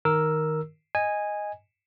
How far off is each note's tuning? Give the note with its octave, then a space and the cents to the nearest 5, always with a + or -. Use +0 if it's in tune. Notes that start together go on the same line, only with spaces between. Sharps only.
D#3 +0 A#4 +0 E6 +0
D#5 +0 G#5 -10